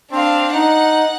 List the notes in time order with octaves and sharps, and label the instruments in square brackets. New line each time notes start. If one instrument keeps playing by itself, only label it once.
[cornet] C4 [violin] D4 F5
[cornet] D#4 [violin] F#5